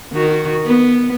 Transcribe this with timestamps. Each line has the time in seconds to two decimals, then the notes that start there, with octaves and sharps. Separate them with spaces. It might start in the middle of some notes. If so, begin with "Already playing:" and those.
0.13 D#3 F#4
0.65 B3